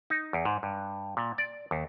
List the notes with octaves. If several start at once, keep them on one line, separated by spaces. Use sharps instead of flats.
D#4
E2
G#2
G2
A#2
D5
D#2